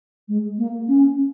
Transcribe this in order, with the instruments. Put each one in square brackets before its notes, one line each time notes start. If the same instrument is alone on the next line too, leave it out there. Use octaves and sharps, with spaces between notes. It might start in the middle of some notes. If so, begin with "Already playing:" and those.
[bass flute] G#3
A#3
C#4